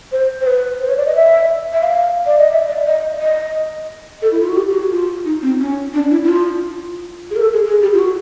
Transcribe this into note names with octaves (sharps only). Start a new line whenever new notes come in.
C5
C5
B4
C5
C#5
D5
D#5
E5
E5
F5
D5
D#5
E5
D5
D#5
D#5
A4
E4
F4
F#4
G4
G4
F#4
F4
D#4
C4
C#4
D4
E4
E4
F4
G#4
A#4
A4
G#4
G#4
G4
F4
F#4